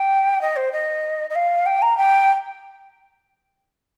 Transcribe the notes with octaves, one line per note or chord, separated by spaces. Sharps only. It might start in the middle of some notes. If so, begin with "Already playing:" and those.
Already playing: G5
D#5
C5
D#5
D#5
F5
G5
A#5
G5